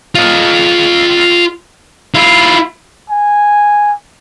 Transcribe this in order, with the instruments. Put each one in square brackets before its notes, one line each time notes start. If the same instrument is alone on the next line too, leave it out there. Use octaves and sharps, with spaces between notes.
[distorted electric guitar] F4 D#5
E4 F4
[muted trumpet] G#5